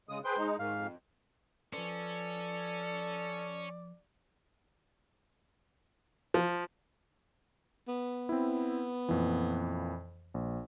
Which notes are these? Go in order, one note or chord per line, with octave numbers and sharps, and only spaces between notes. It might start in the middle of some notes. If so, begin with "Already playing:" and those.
C#3 G#3 D#6
G#4 B4 C5 G5 C6
G#3 D#4
G#2 D#3 F5
F2
F3 C#4 A4 B4 C5 D5
F3
B3
C4 E4
F2 A#2 E3
A#1